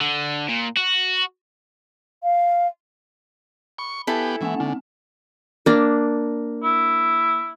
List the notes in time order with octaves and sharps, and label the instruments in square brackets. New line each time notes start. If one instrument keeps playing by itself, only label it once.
[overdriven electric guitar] D3
A#2
F#4
[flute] F5
[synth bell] B5 [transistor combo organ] C#6
[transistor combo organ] B3 G4 [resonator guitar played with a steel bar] E4 A4 [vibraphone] G#5
[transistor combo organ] E3 [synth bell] G#3 A#3 G#5 [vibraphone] C#4 F#5
[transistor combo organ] D3 [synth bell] C4
[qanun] A#3 D4
[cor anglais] E4